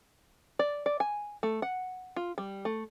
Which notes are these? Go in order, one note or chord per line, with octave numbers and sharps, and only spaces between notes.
D5
D5
G#5
A3
F#5
F4
G3
A3